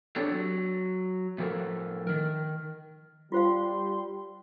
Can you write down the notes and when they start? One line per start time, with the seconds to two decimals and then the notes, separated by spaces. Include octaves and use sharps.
0.16 C4 D4 G4 A4 C#5
0.31 F#3
1.38 A2 F3 A4 A#4
2.07 D#3 A#4
3.32 G3 F4 C5 F5 C6